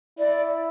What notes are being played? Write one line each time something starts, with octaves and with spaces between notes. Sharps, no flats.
E4 D5